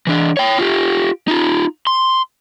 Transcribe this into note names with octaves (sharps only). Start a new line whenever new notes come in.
E3 D4
C#5 G5
F4 G4
D#4 F4
C6